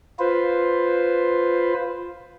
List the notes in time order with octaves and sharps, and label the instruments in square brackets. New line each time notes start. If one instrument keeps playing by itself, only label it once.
[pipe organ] F4 B4 C5